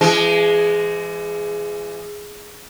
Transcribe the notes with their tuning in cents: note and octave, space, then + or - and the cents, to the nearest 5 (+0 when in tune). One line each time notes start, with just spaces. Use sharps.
E3 +45 G#3 +0 G#4 +0